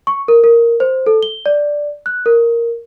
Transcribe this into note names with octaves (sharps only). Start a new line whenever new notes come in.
C#6
A#4
A#4
C5
A4
G7
D5
F#6
A#4